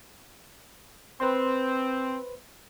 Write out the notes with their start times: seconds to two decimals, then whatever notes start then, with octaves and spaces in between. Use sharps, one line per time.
1.20 C4 B4 C5 C6